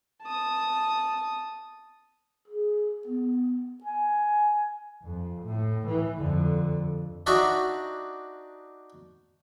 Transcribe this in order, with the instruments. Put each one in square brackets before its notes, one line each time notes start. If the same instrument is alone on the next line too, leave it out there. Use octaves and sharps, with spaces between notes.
[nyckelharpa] A5 D#6
[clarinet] G#4
B3
G#5
[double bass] F2
A2
E3
F2 D3
[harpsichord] D4 D#4 F#4 D#5 E5 F#5